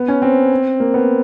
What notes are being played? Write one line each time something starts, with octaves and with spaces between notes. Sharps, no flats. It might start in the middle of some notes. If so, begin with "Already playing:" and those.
Already playing: B3
C#4
C4
A#3
B3